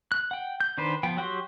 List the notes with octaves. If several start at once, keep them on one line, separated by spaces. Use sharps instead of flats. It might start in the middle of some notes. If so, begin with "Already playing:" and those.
F#6
F#5 G5
G6
D#3 D4 B4 C5
F3 B3 G5
F#3 F#4 G4 C6